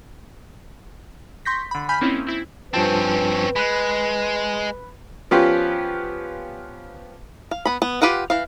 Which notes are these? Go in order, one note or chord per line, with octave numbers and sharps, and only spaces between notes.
C6 C#6 G6 A#6 B6
D3 B5
G#5 B5 F6 G6 B6
A#3 C4 C#4 D#4 E4
C4 E4
G2 F3 C4 C#4 B4 A5
G#3 B5 F#6
F3 B3 C#4 F4 G4
F5
B3 B5
B3
F4 G4 B4 F5 F#5
E3 F5